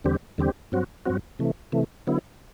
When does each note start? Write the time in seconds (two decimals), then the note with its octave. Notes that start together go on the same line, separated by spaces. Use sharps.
0.04 E2 D3 G3 C4 G4
0.38 E2 D3 G3 C4 G4
0.72 G2 F#3 C4 F#4
1.05 G2 F#3 C4 F#4
1.39 C3 E3 A3
1.72 C3 E3 A3
2.07 D3 F#3 B3 E4